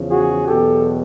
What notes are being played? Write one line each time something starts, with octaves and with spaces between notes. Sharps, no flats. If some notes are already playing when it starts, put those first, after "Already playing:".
Already playing: E2 C#3 F3
F#4 G#4
E2 B2 F#3 G4 A4